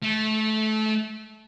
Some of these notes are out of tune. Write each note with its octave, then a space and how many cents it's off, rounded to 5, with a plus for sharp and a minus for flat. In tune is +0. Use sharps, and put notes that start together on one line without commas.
A3 -20